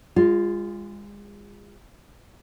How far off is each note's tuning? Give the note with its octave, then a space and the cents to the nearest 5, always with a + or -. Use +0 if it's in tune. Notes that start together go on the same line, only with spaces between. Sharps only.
G#3 -35 F4 +0